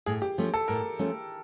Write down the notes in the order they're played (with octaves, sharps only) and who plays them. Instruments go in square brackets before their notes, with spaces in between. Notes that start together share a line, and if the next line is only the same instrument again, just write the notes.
[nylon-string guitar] A2 [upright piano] G#4
[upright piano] G4
[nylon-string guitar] F3 A3 C#4
[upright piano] A4
[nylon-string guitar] A2 [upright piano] A#4
[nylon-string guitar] F3 A3 C#4